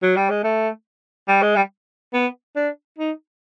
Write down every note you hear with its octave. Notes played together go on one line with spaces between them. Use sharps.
F#3
G3
G#3
A3
G3
G#3
G3
B3
D4
D#4